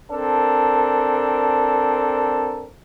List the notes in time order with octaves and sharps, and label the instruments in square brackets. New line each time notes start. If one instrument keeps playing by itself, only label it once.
[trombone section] C4 D4 A4 A#4